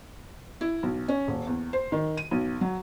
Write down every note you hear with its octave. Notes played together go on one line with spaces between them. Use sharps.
E4
B1
C#4
D#1
E2
C5
D#3
D#7
B1
F#3